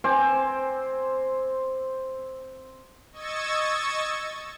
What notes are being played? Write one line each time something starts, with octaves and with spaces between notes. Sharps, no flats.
C4 C5 G#5 D6
D#5 C#6 E6 G#6 A6